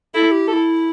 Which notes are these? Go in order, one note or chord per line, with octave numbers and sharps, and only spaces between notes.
E4 A4
G4
G4 A4
E4